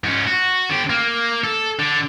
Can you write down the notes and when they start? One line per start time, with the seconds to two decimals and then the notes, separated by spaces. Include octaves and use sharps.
0.04 G#2 C#4
0.27 F#4
0.70 D3 G4
0.89 A#3
1.44 A4
1.79 D3